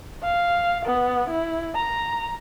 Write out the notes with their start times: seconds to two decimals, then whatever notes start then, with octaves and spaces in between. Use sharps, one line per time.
0.23 F5
0.85 B3
1.30 E4
1.75 A#5